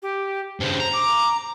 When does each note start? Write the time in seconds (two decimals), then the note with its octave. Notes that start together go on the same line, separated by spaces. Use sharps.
0.02 G4
0.60 G2 C#3 C5
0.80 A#5
0.93 D6